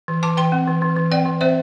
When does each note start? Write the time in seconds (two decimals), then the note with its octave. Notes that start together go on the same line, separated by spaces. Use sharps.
0.08 E3
0.22 E3 A5 D6
0.37 E3 G5 C6
0.52 C4
0.68 E3
0.82 E3
0.97 E3
1.11 C4 D5 G5
1.26 E3
1.41 C4 C5 E5